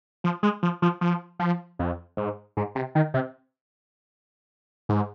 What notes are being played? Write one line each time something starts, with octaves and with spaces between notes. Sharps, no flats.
F3
G#3
F3
F3
F3
F3
F2
G#2
G#2
C3
D#3
C3
G#2